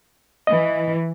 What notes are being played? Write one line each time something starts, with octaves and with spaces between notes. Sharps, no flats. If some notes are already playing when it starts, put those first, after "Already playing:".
E3 D#5